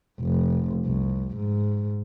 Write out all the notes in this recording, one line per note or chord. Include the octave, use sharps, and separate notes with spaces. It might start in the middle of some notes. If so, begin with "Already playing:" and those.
F1
C2
G#2